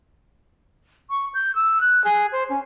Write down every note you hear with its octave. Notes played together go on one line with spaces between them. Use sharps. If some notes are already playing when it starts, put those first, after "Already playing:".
C#6
G6
E6
F#6
G#4
C5
C#4